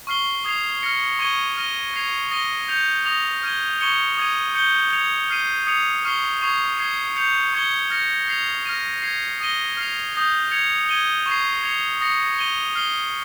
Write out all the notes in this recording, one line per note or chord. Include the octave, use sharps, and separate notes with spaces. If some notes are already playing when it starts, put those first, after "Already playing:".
C#6 F6 C7 G7
D#6 G#6 C7 F7
F6 A#6 C#7
C#6 G#6 D#7 G7
F6 A#6 D#7 G7
G#6 C7 F7
D#6 A#6 D#7 G7
G6 C#7 F7
D#6 A#6 F7
F6 G#6 D#7 G7
C#6 G#6 C#7 G7
D#6 G#6 D#7
G6 C#7 G7
G#6 C#7 F7
F6 C7 D#7 G7
D#6 G#6 C#7 F7
C#6 F6 C7 G7
C#6 G#6 C7 F7
G#6 C7 G7
G6 C#7 F7
C#6 G#6 C#7 G7
F6 A#6 C#7
G#6 C7 F7
F6 A#6 D#7
G#6 C7 F7
D#6 A#6 D#7 G7
F6 C7 F7
D#6 G6 A#6
G#6 C#7 F7
G#6 D#7 G7
C#6 G#6 C7
G#6 C#7 F7
D#6 A#6 C#7
G#6 D#7 G7
F6 C7 G7